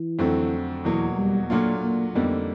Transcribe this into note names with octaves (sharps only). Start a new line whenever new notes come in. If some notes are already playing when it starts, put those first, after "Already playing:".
Already playing: E3
F2 D3 F#3 A3 C4
E2 B2 E3 F#3 A#3
G3
A#2 F#3 A3 A#3 D4 F4
A#3
F2 D3 G3 A#3 B3 D#4